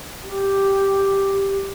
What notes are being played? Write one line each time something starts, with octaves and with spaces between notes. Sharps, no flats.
G4